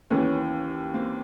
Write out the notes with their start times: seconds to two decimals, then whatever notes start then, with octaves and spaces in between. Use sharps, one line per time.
0.10 D#2 C#3 E3 B3 C#4
0.94 A#3 C4